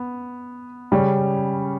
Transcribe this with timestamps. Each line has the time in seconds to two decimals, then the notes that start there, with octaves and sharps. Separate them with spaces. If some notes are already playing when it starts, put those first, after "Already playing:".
Already playing: B3
0.92 C#3 G3 C#4